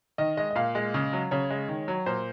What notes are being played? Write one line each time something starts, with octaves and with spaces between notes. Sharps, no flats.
D#3 D#5
G#3 D#5
D#5
A#2 F5
G#3
C#3
F#3
C#3 C#5
G#3
D#3
F#3
A#2 C5